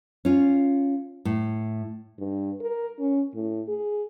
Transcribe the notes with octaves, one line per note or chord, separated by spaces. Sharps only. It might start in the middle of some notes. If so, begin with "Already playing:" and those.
C#4 F4
A2
G2
A#4
C#4
A2
G#4